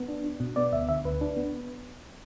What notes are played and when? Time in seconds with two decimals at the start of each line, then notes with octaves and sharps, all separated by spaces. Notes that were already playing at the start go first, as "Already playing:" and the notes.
Already playing: B3
0.08 D4
0.24 D4
0.40 B2
0.56 B3 D5
0.72 D2 E5
0.89 D3 E5
1.05 D2 B4
1.21 D4
1.37 B3